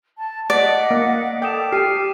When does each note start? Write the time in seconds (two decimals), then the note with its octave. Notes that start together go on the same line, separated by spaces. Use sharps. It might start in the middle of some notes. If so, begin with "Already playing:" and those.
0.19 A5
0.50 D5 D#5 F#5 B6 D7
0.91 A#3
1.42 A4 G5 D6 D#6 E7
1.72 G4 F6 C7 D#7